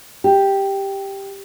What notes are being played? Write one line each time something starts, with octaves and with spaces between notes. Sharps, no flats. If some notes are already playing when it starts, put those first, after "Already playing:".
G4